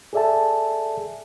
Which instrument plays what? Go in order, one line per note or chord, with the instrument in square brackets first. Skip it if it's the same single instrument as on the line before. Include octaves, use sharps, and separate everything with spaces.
[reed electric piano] G#4 A4 D5 E5 G#5 A5